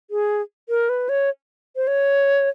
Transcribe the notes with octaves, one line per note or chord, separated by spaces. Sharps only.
G#4
A#4
B4
C#5
C5
C#5